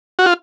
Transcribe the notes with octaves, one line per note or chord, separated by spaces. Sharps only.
F#4
F4